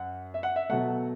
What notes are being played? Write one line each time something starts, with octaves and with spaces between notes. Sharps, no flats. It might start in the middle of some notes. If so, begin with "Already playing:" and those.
Already playing: F#2 F#5
E5
F#5
E5
B2 F#3 A3 F#5